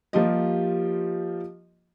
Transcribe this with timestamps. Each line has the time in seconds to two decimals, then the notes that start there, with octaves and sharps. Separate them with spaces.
0.13 F3 G3 A#3 F4 G4 D#5